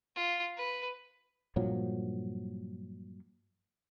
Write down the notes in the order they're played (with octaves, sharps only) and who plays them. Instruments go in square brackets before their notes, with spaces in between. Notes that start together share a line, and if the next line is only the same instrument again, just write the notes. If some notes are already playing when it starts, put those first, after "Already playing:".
[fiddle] F4
B4
[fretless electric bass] G2 A#2 F3 F#3